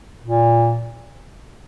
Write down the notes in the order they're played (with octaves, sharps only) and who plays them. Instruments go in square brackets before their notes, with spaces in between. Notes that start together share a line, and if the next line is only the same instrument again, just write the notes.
[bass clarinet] A#2